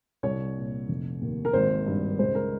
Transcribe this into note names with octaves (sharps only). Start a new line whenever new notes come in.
C2 C#5
A#2
F1
D#2
A#4
G#1 C5
G2
C#2 C5
A#4